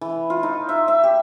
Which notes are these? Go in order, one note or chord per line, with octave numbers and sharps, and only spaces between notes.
E3
F4
D#4
E5
E5
G4